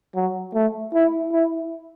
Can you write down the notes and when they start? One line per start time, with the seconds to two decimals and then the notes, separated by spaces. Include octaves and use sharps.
0.15 F#3
0.54 A3
0.94 E4
1.33 E4